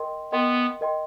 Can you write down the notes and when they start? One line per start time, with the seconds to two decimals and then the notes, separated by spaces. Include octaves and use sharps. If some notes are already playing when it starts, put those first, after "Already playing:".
Already playing: A#4 D#5 G5 C6
0.32 B3 A#4 D#5 G5 C6
0.81 A#4 D#5 G5 C6